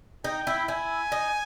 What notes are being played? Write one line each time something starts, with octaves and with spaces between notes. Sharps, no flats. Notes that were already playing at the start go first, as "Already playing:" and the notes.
D#4 G5
E4
E4 G#5
D#4